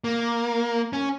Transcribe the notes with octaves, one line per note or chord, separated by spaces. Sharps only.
A#3
C#4